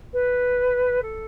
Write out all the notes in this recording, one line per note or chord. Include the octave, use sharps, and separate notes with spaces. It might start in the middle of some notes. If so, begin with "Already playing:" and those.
B4
A4